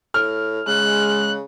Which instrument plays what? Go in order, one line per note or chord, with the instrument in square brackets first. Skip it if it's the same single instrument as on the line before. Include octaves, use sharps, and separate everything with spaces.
[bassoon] A2 [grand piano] F6
[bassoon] C#3 [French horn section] G#3 [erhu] F#6